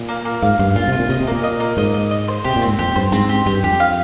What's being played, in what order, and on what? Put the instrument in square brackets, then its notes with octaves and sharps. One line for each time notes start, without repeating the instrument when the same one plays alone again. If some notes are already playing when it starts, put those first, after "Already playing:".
Already playing: [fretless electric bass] A#2
[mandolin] A#3
A#3
[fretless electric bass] G#2 [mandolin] F5
[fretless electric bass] G2 [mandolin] F5
[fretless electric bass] A#2 [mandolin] F4
[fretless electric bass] C3 [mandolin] F4
[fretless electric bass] A#2
[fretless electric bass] C3 [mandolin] D#5
[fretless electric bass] C3
[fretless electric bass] A#2 [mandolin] A#3
[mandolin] D#5
A#3
[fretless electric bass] G#2 [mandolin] D#5
[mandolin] D#5
D#5
C5
[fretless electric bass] C3 [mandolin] G4
[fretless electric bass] A#2
[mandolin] C4
[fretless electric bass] G#2
[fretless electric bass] F2 [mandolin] G4
[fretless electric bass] G2 [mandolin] C5
[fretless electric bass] G#2 [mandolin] C4
[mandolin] G4
[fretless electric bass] G2 [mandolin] G4
[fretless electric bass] F2 [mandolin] G4
[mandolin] F5